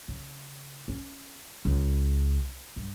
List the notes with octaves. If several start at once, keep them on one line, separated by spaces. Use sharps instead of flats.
C#3
C#4
C#2
G2